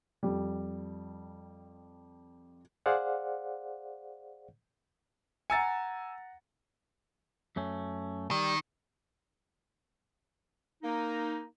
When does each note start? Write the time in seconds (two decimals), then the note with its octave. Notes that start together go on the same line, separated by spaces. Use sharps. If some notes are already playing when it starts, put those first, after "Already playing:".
0.23 F2 G3
2.86 G#4 C5 D5 F5 F#5
5.50 F#5 G#5 A#5 E6 A6 C#7
7.56 F#2 A3 C#4
8.31 D#3 G3
10.83 A#3 D#4